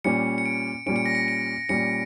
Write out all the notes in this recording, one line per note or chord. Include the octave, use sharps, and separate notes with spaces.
A#2 G3 C#4 C#7
C#7
D7
A#2 G3 C#4 D7
C#7
A#6
C#7
D7
A#2 G3 C#4 C#7